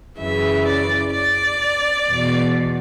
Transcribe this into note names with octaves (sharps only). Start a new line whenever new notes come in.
F#2 C#3 E3 E5
D5
D5
E2 B2